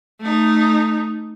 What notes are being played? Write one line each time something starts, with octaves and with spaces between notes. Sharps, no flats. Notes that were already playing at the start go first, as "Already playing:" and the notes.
A3 D#4